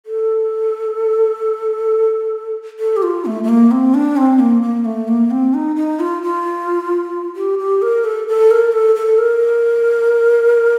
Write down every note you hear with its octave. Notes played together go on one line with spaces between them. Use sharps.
A4
A4
G4
F4
A3
A3
A#3
C4
D4
C4
A#3
A#3
A3
A#3
C4
D#4
D#4
F4
F4
G4
G4
A#4
A4
A4
A#4
A4
A4
A#4